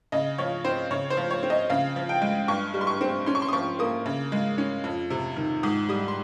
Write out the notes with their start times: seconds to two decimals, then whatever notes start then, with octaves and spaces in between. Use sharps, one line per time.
0.12 C#3 D#5
0.38 F3 C#5
0.64 C4 C5
0.91 C#3 C#5
1.10 C5
1.17 F3
1.31 C#5
1.43 C4
1.50 D#5
1.70 C#3 F5
1.96 F3
2.09 G5
2.22 G#3
2.48 G2 C#6
2.74 G3
2.81 C6
2.87 C#6
3.01 C4
3.26 C#4 C6
3.35 C#6
3.42 C6
3.48 D#6
3.53 F3 C#6
3.79 A#3 D#6
4.06 C#3
4.32 G#3
4.58 C#4
4.84 F2
5.10 C3
5.36 D#3
5.63 G#2 D#6
5.89 G3 D#6
6.08 C6